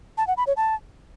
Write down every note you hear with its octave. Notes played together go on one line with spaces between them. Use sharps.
A5
F#5
B5
C#5
A5